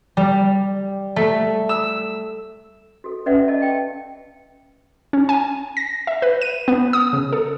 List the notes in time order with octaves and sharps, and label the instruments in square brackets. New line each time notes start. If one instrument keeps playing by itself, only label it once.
[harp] G3
A3
E6
[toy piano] F#4 A4
C#4 B4 D5 E5 F#5
D#5 A5
F5 G5 A5
[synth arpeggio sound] C#4
G#5
A#6
E5
B4
D#7
B3
D#6
C#3
A4